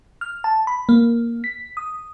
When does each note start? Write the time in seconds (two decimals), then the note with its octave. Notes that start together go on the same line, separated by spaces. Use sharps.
0.21 F6
0.44 A5
0.67 B5
0.89 A#3
1.44 B6
1.77 D#6